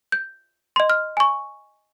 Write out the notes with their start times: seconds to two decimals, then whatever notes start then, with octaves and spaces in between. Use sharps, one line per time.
0.12 G6
0.76 D#5 C6
0.90 F6
1.17 G#5 C#6